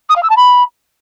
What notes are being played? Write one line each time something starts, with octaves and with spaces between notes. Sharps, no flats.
D#6
F5
E6
A5
B5